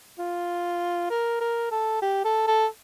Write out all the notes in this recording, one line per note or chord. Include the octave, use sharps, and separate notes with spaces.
F4
A#4
A#4
A4
G4
A4
A4